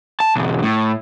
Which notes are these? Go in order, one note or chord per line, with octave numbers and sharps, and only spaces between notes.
A5
B1 E2
A2